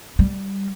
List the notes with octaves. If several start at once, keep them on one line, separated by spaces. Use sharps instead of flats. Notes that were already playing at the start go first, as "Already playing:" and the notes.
G3